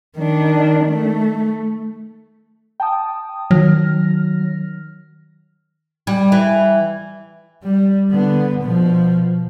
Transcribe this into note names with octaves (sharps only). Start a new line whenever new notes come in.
D#3 D4
A3
G5 A5 D#6
D#3 F#3 F6 A#6
G3
E3
G3
D3 B3
B2 F3